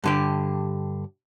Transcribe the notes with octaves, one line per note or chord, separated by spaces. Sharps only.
G2 D3 G4